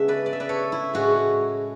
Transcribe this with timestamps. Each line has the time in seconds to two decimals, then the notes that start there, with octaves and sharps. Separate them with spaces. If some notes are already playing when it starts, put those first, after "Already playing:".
Already playing: C#3 G#3 B3 D4 E5 F#5
0.08 B4 D5
0.26 D5
0.33 E5
0.40 B4 D5
0.49 A4 C#5
0.72 E4
0.94 A2 G#3 C#4 F#4